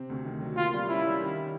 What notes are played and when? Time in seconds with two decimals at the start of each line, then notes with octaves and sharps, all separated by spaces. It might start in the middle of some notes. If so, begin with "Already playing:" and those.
Already playing: C3 C4
0.10 D2
0.25 D#3
0.41 F#3
0.57 A#3 F4
0.73 G3
0.88 C#4 E4
1.05 G3
1.20 D#3